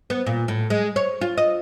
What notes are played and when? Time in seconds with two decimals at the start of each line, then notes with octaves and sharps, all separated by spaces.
0.10 B3
0.26 A#2
0.48 A2
0.70 G#3
0.96 C#5
1.21 F4
1.38 D#5